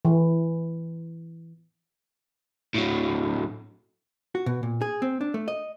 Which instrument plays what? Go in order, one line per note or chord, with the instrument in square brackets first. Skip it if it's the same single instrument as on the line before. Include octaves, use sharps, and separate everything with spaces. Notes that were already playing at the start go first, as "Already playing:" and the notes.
[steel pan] E3
[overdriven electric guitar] A2 F#3
[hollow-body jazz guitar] F#4
B2
A#2
G#4
C4
D4
A3
D#5